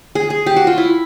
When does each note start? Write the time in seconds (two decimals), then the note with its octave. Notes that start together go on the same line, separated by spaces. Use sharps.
0.15 G#4
0.30 G#4
0.46 G4
0.56 F#4
0.67 F4
0.78 E4